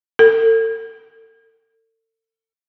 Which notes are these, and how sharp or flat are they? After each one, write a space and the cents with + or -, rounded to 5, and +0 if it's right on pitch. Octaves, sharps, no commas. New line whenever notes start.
A4 +40